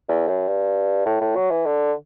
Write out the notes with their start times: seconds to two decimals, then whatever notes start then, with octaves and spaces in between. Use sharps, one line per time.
0.08 E2
0.28 F#2
0.48 G2
1.06 A2
1.21 A2
1.36 F#3
1.51 E3
1.66 D3